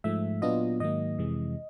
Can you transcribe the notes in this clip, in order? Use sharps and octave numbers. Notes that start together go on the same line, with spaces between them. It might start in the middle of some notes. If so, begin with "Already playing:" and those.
G#2 F3 A3 E5
A#2 F#3 B3 D4 F4 D#5
G#2 D#3 F#3 A#3 D#5
F2 C3 E3 G#3